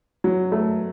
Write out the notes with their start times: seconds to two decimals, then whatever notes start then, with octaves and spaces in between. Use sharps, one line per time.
0.24 F#3
0.52 A3